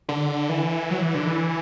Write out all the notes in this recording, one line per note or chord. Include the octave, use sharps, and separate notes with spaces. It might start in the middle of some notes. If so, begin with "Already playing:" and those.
D3
E3
F#3
E3
D3
E3